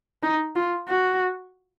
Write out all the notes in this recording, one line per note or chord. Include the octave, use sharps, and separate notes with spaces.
D#4
F4
F#4